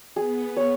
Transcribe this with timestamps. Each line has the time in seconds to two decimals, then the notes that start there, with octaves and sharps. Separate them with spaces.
0.16 B3 G#4
0.56 C#5